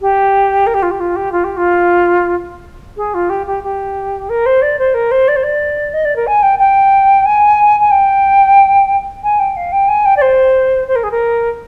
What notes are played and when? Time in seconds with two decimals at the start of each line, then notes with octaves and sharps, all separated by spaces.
0.01 G4
0.66 A#4
0.74 G4
0.82 F4
0.91 G4
1.00 F4
1.16 G4
1.32 F4
1.44 G4
1.56 F4
2.96 G#4
3.14 F4
3.29 G4
3.46 G4
3.63 G4
4.29 A#4
4.45 C5
4.61 D5
4.78 C5
4.94 A#4
5.11 C5
5.28 D5
5.36 C5
5.43 D5
5.93 D#5
6.04 D5
6.15 A#4
6.26 G#5
6.42 G5
6.58 G5
7.25 G#5
7.80 G#5
7.90 G5
9.23 G#5
9.39 G5
9.56 F5
9.72 G5
9.88 G#5
10.05 G5
10.16 D5
10.21 C5
10.87 C5
10.95 A#4
11.03 G#4
11.11 A#4